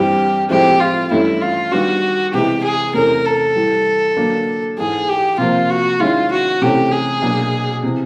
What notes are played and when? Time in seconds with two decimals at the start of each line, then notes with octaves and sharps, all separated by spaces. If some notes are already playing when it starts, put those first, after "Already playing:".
Already playing: G2 E3 G3 C4 E4 G4
0.50 A2 F3 G#3 C4 E4 G4
0.80 F4
1.11 G2 E3 A3 C#4 E4
1.41 F4
1.72 D#3 G3 B3 D4 F#4
2.33 C3 E3 G#3 B3 E4 G4
2.64 G#4
2.94 E2 C3 E3 A3 C#4 A#4
3.25 A4
3.55 A2 E3 G3
4.17 D3 F#3 A#3 D4
4.78 G#2 E3 G#3 G#4
5.09 G4
5.38 C3 F3 A#3 F4
5.70 F#4
6.00 D#3 G#3 C#4 E4 F4
6.31 F#4
6.61 C3 E3 A3 C#4 G4
6.91 G#4
7.22 B2 F#3 A#3 D4
7.83 C3 E3